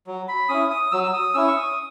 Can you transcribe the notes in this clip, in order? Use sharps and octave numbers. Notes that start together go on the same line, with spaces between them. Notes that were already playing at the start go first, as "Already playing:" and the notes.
F#3
B5
C#4 E4 D#6
D#6
F#3 E6
E6
D#6
C#4 E4 E6
C#6
D#6